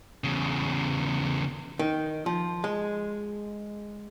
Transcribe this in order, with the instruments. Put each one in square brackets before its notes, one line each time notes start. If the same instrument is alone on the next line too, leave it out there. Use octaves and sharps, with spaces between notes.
[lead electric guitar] E2 C#3
[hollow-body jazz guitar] D#3
F3
G#3